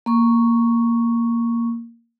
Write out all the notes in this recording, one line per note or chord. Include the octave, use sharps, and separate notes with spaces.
A#3 C#6